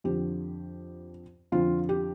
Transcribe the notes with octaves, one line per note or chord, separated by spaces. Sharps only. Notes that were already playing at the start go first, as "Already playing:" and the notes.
F2 D3 F3 G4
F2 D3 F3 F4
G4